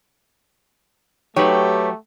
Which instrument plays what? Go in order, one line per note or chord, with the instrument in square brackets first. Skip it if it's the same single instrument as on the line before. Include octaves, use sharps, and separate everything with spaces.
[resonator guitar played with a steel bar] F#3 D#4 G5 [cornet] A3 [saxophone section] G4 [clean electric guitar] B4 C#5